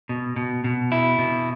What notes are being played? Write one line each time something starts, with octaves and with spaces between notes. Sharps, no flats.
B2
B2
B2
E4
B2